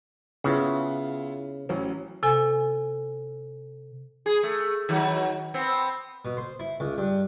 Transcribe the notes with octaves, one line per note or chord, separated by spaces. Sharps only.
C#3 B3 E4 F4
A1 F#3 C#4
C3 A4 G#5
G#4
A3
D#3 F#3
B3 C4
B2
C5
E4
C#2
G2